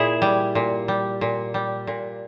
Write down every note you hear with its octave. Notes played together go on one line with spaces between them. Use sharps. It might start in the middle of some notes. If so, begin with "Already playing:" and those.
Already playing: A#2 E4 G#4
G3
A#2
G3
A#2
G3
A#2